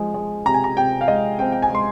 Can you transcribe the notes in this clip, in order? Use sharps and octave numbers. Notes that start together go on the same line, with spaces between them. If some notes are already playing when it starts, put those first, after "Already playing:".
Already playing: F3 G#3
G#3
C3 A#5
G#5
A#5
C3 G5
F5
G#3 D#5
C4 G5
G5
G#5
G#3 C6